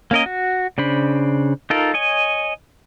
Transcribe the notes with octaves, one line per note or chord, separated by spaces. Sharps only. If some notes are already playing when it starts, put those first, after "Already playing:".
A#3 C#4 A#4 D#5
F#4
C#3 D4 C5 B5
D#4 F4 A4 A#4
C#5 D#5 G#5